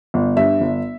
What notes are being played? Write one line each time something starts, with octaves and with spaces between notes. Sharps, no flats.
G1
G2 E5
G1